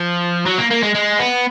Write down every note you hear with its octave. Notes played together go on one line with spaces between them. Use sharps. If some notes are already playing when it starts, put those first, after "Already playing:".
Already playing: F3
F#3
A#3
A#3
G#3
G#3
B3